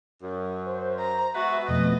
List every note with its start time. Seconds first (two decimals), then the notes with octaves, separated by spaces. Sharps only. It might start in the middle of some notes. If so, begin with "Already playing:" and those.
0.22 F#2
0.66 C5
1.00 A#5
1.35 G#3 B3 F#4 B4 E5
1.68 F2 B2 A3 D#5